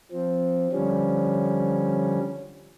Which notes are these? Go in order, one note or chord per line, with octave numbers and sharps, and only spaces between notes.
F3 C4
D3 F3 G3 C#4